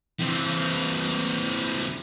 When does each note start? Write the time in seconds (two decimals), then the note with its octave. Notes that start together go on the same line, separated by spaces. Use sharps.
0.19 E3 C4